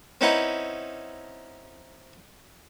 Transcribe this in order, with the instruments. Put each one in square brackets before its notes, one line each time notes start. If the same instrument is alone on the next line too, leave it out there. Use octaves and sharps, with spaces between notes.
[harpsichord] C4 C#4 D#4 E4 B4 F#5